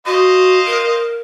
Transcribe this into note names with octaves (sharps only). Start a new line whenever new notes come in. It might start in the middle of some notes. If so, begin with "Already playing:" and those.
F#4 C5 D#5 F5
A#4